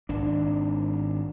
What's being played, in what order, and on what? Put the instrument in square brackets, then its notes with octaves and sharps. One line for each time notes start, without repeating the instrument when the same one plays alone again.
[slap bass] G#1 D4